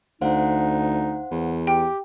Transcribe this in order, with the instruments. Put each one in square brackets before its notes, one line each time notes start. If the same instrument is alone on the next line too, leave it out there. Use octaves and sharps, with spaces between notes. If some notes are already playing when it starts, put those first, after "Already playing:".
[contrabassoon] D2 [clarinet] D#4 [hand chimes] C5 F5 F#5
[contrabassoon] E2
[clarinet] G4 [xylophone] G5